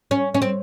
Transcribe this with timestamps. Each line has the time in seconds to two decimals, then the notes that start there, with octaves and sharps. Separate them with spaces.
0.11 C#4
0.34 C#4
0.42 C4